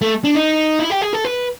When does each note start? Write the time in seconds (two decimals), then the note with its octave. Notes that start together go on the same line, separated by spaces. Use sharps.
0.02 A3
0.24 D4
0.35 D#4
0.80 E4
0.91 G4
1.02 G#4
1.13 A4
1.25 B4